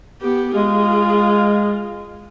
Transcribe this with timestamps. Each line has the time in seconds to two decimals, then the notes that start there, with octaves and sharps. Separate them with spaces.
0.22 B3 G4
0.55 G#3 F4 G#4